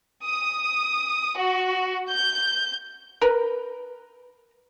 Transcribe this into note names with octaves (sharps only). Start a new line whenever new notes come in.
D#6
F#4
G6
A#4 B4